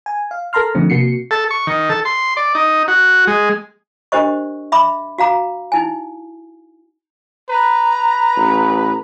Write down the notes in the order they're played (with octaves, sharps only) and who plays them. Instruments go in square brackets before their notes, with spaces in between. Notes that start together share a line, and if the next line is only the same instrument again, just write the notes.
[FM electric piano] G#5
F5
A4 A#4 A5 A#5 C6 F6
D3 D#3 F3 A3 C4
C3 A#3 F#4 C7 C#7
[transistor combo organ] A4
C#6
D#3
A4
C6
D5
D#4
F#4
G#3
[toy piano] D4 G4 A#4 C5 D#5 C#6
E5 B5 D6
F#4 F5 A#5 D6
D#4 E4 G#5
[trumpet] B4 [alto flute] A#5
[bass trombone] A1